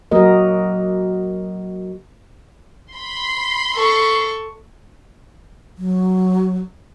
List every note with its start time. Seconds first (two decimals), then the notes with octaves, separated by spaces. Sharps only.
0.11 F#3 A#3 F#4 A#4 D#5
2.93 B5 C6
3.75 A4 C#6
5.78 F#3